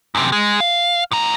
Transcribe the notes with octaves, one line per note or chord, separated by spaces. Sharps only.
F#2 C3
G#3
F5
A2 A#5